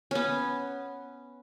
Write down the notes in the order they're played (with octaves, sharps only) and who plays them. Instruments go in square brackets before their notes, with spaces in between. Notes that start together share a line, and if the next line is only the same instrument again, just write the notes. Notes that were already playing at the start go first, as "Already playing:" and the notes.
[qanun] B3 C#4